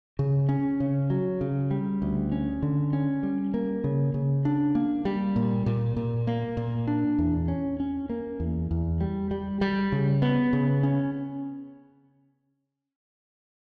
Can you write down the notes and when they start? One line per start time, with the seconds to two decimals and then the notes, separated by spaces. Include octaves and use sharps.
0.19 C#3
0.49 C#4
0.80 C#3
1.10 F#3
1.41 C#3
1.71 G3
2.02 D2
2.32 C#4
2.62 D3
2.93 C#4
3.23 G3
3.54 A#3
3.84 C#3
4.14 C#3
4.45 D4
4.75 A#3
5.05 G3
5.36 A#2
5.66 A#2
5.97 A#2
6.27 A#3
6.57 A#2
6.88 D4
7.18 E2
7.48 C#4
7.80 C#4
8.10 A#3
8.40 E2
8.71 E2
9.01 G3
9.31 G3
9.61 G3
9.92 C#3
10.22 B3
10.53 C#3
10.83 C#4